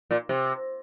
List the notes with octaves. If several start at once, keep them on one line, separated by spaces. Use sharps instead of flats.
A#2
C3